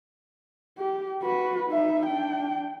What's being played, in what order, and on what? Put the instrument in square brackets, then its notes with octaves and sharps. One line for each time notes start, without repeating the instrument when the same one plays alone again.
[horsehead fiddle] G4
F#4 B4
D#4 E5
D4 G5